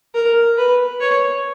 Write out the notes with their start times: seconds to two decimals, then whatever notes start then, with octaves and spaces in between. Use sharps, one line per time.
0.15 A#4
0.58 B4
1.01 C#5